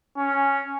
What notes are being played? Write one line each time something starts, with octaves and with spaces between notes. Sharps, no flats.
C#4